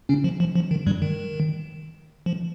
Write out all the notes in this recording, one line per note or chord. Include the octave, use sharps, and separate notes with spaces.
C#3 C#4
F3
F3
F3
D#3
G2 G3
D#3
F3